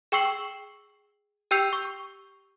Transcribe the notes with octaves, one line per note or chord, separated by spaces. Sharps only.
G#4 G5 C#6 E6 C7 F#7
G4 G5 E6 G6 C7 F7
C#6